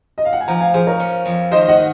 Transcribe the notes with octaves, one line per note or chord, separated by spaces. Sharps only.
D#5
F5
F#5
G#5
F3 F#5 A#5
F5 G#5
F3 G#4 C5
A#4 C#5
C#4
F2
D#3 C5 D#5
D#5 F#5
D#3